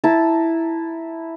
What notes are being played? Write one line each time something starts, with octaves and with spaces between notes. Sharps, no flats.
E4 A5 A#5